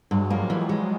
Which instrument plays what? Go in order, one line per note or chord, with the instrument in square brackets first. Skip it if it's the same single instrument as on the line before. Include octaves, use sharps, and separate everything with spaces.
[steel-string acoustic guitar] G2 [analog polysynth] F#3 G#3
[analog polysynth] F3 G3 [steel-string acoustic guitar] A#3
[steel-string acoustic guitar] E3 [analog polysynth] F3 G3
[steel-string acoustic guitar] G#3